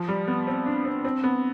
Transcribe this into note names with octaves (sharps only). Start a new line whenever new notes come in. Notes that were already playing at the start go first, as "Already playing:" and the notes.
Already playing: F3
G3
B3
C4
D4
C4
C4
B3